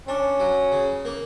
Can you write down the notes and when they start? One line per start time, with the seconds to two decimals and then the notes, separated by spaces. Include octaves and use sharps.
0.08 C#4 D4
0.40 F#3
0.72 C#3
1.05 A#3